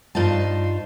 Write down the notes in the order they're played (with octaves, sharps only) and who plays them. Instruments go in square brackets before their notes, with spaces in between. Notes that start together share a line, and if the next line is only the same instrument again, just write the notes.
[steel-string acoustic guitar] G2 D#4 F4 C5 A5